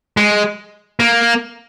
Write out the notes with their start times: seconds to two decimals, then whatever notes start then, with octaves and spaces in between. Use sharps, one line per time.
0.17 G#3
1.00 A#3